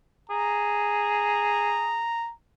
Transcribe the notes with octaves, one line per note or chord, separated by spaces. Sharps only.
G#4 A#5